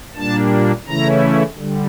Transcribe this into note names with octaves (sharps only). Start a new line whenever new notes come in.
A#2 G3 A#3 D4 A5
C#3 E3 A3 C#4 E4 A#5
D3 G3